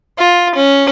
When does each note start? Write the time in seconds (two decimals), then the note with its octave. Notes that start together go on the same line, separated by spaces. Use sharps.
0.18 F4
0.55 C#4